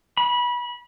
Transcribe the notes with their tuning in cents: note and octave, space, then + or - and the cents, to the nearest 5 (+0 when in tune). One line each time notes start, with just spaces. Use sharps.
B5 -25